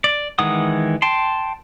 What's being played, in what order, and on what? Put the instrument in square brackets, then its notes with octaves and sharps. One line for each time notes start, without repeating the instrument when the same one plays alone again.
[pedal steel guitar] D5
D#3 E3 G#3 F#5 D#6
G5 A5 C6